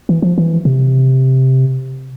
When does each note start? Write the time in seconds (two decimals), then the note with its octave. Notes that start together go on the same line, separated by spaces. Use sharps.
0.09 E3
0.22 F3
0.38 E3
0.65 C3